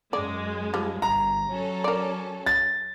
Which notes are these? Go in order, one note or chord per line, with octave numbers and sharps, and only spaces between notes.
F#2 G#3 D5
F3 G3
G1 A#5
F#3 C#4 A4
A#4 D5
A6